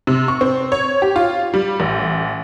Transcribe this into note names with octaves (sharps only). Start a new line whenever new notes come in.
C3
C#6
C4
C#5
G4
F4
G3
A1